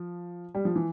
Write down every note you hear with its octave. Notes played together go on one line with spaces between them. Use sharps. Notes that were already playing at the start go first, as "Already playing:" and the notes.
Already playing: F3
G3
F3
E3